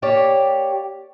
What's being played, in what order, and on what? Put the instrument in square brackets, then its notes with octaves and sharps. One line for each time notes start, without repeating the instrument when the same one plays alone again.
[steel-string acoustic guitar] A#3 G4 C#5 D5